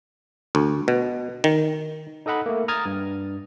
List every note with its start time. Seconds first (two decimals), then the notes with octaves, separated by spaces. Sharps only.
0.55 D2
0.88 B2
1.44 D#3
2.26 D#4 A4 D#5 F#5 B5
2.46 A3 A#3
2.68 A#5 D#6 F6 G#6 A6
2.85 G2